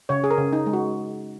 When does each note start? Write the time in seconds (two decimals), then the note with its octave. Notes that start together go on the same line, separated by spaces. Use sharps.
0.09 C#3 C#5
0.24 G#4
0.31 A#4
0.38 C#3
0.53 D#4
0.66 G#3
0.73 F#4